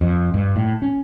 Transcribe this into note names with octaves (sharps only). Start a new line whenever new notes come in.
F2
G2
A2
C#4